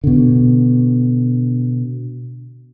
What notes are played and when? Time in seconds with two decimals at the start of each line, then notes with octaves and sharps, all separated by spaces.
0.04 B2 D3